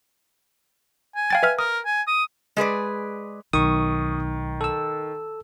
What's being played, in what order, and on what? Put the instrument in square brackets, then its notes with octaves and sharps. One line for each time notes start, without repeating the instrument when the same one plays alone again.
[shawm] G#5
[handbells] F5 G5 A6
B4 E5 F6
[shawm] A#4 [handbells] D#6
[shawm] G#5
D#6
[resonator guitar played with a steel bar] G#3 G#4 B4 D5
[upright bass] B1 [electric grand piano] D#3 [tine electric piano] C#6 D#6
[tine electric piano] A4 E6